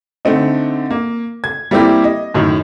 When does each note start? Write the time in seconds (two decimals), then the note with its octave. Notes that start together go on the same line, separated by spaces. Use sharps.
0.25 D3 A3 C4 D#4
0.91 A#3
1.44 G#6
1.71 G3 A#3 C4 E4 G4
2.04 D#5
2.34 F#2 A2 D#3